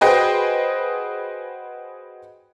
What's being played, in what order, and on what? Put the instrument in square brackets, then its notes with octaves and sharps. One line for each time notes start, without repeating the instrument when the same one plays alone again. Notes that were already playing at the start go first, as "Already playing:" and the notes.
[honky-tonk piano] F#4 G#4 B4 C5 D#5 G5